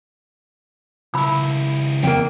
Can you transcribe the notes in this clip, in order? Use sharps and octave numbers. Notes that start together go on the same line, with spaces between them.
C#2 E4 B5 E6
F2 A#3 G5